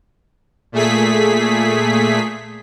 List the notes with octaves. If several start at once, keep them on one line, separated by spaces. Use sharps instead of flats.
A#2 A3 G#4 B6